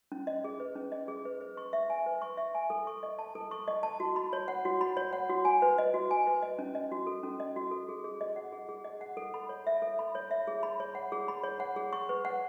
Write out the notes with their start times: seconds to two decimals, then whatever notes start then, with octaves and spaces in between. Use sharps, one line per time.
0.12 C#4
0.27 D#5
0.44 G#4
0.60 B4
0.76 C#4
0.92 D#5
1.08 G#4
1.25 B4
1.41 B4
1.57 C#6
1.73 E5
1.90 G#5
2.06 B4
2.22 C#6
2.37 E5
2.55 G#5
2.70 A4
2.87 C#6
3.03 D#5
3.19 A5
3.35 A4
3.51 C#6
3.68 D#5
3.83 A5
4.00 F#4
4.16 B5
4.33 C#5
4.48 F#5
4.65 F#4
4.81 B5
4.97 C#5
5.13 F#5
5.30 F#4
5.45 G#5
5.62 B4
5.78 D#5
5.94 F#4
6.11 G#5
6.27 B4
6.42 D#5
6.59 C#4
6.75 D#5
6.92 F#4
7.07 A4
7.23 C#4
7.40 D#5
7.56 F#4
7.71 A4
7.89 G#4
8.04 G#4
8.21 D#5
8.36 F#5
8.53 G#4
8.69 G#4
8.85 D#5
9.01 F#5
9.17 A4
9.34 B5
9.49 C#5
9.67 E5
9.82 A4
9.99 B5
10.15 C#5
10.31 E5
10.47 G#4
10.63 B5
10.80 C#5
10.95 F#5
11.12 G#4
11.28 B5
11.43 C#5
11.60 F#5
11.76 G#4
11.93 C#6
12.09 B4
12.25 F#5